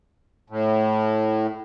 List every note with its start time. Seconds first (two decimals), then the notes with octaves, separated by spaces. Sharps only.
0.50 A2